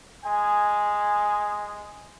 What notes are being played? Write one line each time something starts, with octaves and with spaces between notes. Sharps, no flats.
G#3 G#5